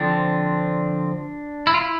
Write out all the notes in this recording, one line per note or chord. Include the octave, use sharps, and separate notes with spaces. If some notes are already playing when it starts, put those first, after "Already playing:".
Already playing: D3 F3 C4 D4
E4
F4
E4